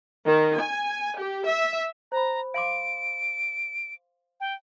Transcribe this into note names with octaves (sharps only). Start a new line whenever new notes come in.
D#3
G#5
G4
E5
C5 A#5 B5
F5 C6 D6 D7
G5